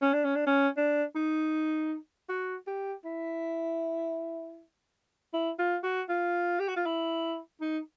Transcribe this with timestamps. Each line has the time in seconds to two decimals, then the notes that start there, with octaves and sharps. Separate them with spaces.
0.02 C#4
0.13 D4
0.25 C#4
0.36 D4
0.47 C#4
0.77 D4
1.15 D#4
2.29 F#4
2.67 G4
3.05 E4
5.33 E4
5.59 F4
5.84 F#4
6.09 F4
6.60 G4
6.68 F#4
6.77 F4
6.86 E4
7.61 D#4